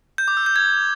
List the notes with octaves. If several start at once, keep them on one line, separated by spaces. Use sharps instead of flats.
G6
D6
E6
G6
G#6